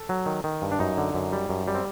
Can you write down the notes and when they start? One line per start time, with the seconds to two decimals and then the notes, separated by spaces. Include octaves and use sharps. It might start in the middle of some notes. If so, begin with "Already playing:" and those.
Already playing: A4
0.09 F#3
0.26 D#3
0.44 D#3
0.62 G2
0.72 D4
0.79 F#2 D#4
0.98 D3
1.14 F#2
1.33 G3
1.49 F#2
1.68 G3
1.75 C4